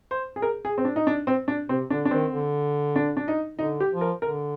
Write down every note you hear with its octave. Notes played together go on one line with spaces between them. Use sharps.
C5
G#4
A#4
G#4
C4
D4
D#4
D4
C4
D4
C3 C4
D3 D4
D4
D#3 C4
D3
D4
D4
D#4
D3 D#4
G4
F3
A#4
D3 A#4